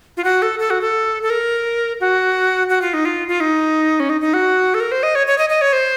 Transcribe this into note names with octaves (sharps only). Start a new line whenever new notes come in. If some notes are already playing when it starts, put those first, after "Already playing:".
F4
F#4
A4
A4
F#4
A4
A4
A#4
F#4
F#4
F4
D#4
F4
F4
D#4
C#4
D#4
D#4
F#4
A4
A#4
C5
D#5
C#5
C#5
D#5
D#5
C#5
C5